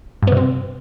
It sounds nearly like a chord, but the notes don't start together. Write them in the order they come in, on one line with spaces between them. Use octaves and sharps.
G2 B3 C3 C4